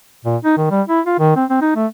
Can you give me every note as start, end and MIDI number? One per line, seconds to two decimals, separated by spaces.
0.25 0.37 46
0.44 0.54 63
0.57 0.67 51
0.71 0.82 55
0.89 1.00 64
1.06 1.17 65
1.19 1.35 51
1.36 1.45 60
1.50 1.58 60
1.62 1.75 63
1.75 1.86 57